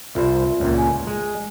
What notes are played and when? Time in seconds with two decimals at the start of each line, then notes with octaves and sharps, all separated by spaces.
0.15 C2 F4 C5 E5
0.60 C#2 A#2
0.78 G#5
1.07 G#3